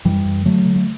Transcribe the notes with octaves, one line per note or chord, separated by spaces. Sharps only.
F#2 E3 G3
F#2
D3 F#3 A3
D3
A3